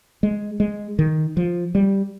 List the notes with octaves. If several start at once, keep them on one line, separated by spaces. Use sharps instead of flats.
G#3
G#3
D#3
F3
G3